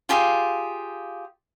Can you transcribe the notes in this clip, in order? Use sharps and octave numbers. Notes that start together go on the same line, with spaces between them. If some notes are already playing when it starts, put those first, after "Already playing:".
F4 G4 G#4 F5